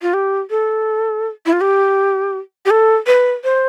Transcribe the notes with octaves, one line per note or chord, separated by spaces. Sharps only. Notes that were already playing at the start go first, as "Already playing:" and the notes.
F4
G4
A4
E4
F4
G4
G4
A4
B4
C5